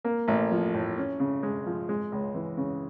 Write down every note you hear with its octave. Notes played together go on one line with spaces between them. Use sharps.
A#3
A1
F3
A2
C#4
C#3
G#3
F3
G#3
C#2
E3
C#3